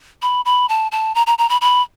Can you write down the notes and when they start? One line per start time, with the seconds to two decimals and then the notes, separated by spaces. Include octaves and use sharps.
0.22 B5
0.45 B5
0.69 A5
0.92 A5
1.15 A#5
1.27 A#5
1.38 A#5
1.49 B5
1.61 B5